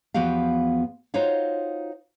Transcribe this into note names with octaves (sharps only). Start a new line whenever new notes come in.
E2 F3 B3 F#4 G4 F5
D#4 F4 F#4 C5 C#5 F5